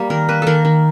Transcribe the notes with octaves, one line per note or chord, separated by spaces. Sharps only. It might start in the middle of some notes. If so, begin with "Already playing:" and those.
Already playing: G3 A#3
D#3 A#4
A#3 B4
D#3 A4 A#4
D#3